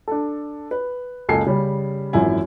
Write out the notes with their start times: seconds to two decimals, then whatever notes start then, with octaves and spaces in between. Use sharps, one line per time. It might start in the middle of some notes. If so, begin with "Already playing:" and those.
0.08 D4 A4
0.71 B4
1.29 F#1 C#2 A4 G#5 C7
1.46 C#3 G3 C#4
2.13 G#1 F#2 E3 F3 E4 G#5